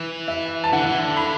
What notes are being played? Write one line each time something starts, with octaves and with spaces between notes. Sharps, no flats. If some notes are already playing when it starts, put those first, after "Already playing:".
Already playing: E3
E5
A5
D3 F#5
E3
D3
B5